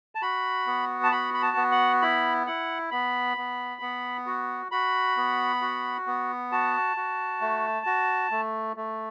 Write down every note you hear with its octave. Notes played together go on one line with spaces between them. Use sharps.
A5
F#4 B5
B3
A5
F#4 B5
B5
A5
B3
F#5
E4 B5
E4 F#5
B3 B5
B3
B3
F#4
F#4 B5
B3
F#4
B3
F#4 A5
F#4
A3
F#4
A3
A3